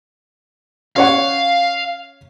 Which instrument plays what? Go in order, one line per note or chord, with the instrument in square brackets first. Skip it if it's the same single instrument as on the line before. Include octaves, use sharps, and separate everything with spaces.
[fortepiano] C#4 C#5 F#5 [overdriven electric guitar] F5